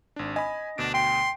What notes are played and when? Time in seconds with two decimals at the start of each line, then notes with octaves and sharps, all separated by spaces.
0.16 G#1 D4
0.36 D#5 G#5 B5
0.78 D2 B2 D4 D7
0.94 G5 C6